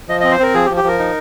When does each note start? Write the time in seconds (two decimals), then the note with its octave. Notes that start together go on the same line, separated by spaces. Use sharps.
0.09 F3 D#5
0.20 C4 D#5
0.31 C5
0.39 C4 A#4
0.54 F3 G#4
0.66 G4
0.70 F3
0.77 G4
0.84 F3 A#4
0.99 D#4